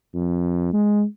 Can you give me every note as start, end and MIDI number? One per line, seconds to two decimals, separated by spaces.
0.14 0.70 41
0.73 1.04 56